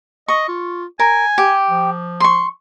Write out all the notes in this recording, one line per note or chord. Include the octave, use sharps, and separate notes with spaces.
D#5 C#6
F4
A#4 G#5
G4
F3
C6 C#6